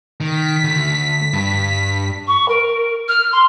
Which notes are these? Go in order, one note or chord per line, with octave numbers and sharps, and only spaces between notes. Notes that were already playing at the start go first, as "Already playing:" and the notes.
D#3 B6
D2
G2
C#6
A#4
F6
C6